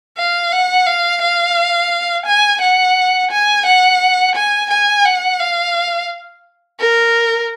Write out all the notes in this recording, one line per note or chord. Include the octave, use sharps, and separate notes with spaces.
F5
F#5
F5
F5
G#5
F#5
G#5
F#5
G#5
G#5
F#5
F5
A#4